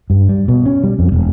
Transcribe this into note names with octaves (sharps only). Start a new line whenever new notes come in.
G2
G3
B2
C#4
G3
F2
E1